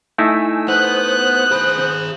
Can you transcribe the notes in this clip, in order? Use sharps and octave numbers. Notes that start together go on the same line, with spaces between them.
A3 D#4 E4 G#5 E6
B3 C5 D#6 F#6 G6
G#4 B5